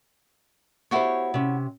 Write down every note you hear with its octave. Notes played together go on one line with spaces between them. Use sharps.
B3 E4 F#4 G4 C5 C#5
C3 C#4